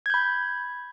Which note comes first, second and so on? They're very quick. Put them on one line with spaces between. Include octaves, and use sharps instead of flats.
G#6 G6 B5